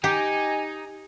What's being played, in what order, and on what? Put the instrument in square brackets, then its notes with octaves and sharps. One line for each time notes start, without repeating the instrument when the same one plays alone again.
[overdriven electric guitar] D#4 [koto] G4 [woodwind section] G#5